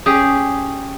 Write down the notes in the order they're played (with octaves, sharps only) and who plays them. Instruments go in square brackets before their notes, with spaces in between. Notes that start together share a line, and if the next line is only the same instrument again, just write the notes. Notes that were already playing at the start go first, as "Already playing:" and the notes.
[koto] C#4 G4 G#4